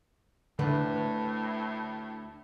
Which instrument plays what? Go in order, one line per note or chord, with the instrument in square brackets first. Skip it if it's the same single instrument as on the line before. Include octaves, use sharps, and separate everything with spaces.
[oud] D2 D4 B4 [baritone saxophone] A2 [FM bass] D3